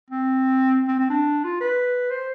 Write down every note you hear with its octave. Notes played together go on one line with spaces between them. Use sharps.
C4
C4
C4
D4
F4
B4
C5